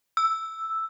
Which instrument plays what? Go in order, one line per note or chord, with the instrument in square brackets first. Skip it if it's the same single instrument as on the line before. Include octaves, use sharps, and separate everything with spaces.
[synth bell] E6